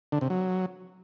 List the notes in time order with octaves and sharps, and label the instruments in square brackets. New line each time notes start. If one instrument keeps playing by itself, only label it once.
[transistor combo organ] D3
C3
F#3